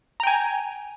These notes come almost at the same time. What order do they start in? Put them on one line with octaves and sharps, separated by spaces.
A#5 G5 G#5